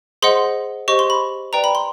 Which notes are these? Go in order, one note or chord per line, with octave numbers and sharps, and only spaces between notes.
G#4 C5 D#5 F#5 C6
G4 C5 D#5 C#6
C6
B5
B4 D5 G5 A#5
B5
C6